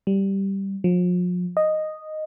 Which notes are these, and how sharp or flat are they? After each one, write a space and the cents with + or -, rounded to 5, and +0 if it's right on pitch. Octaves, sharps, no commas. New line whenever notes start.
G3 -5
F3 +40
D#5 -5